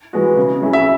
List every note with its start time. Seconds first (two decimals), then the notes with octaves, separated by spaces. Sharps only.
0.13 E3 G#3 B3 F#4
0.37 C#3
0.61 F#3 C#4 E4 G#4
0.73 E5